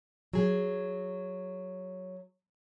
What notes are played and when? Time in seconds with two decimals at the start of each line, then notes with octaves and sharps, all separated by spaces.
0.33 F#3 G#4